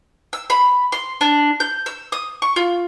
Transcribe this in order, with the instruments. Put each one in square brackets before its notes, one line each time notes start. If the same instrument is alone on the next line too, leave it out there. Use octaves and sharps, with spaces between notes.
[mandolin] E6
B5
C6
D4
G6
E6
D#6
C#6
F4